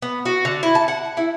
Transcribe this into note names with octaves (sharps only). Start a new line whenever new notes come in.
B3
F#4
D3
E4
A5
F#5
E4